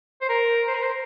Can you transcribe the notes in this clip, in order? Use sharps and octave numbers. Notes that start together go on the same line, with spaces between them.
C5
A#4
C5
A#4
C5